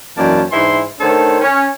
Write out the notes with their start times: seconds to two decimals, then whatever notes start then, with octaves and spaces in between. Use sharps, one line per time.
0.17 F#2 D#3 E3 A#3 D5 A5
0.50 G#2 E3 D4 E4 G#5 C6
0.99 D#3 A3 D4 A4 C5 C#5
1.41 C#4